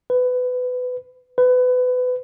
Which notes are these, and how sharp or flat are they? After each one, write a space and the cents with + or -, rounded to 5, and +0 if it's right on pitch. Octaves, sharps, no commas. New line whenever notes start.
B4 +20
B4 +25